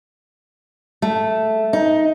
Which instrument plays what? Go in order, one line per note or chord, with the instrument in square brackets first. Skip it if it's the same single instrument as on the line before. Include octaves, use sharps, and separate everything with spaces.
[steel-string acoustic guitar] A3
D#4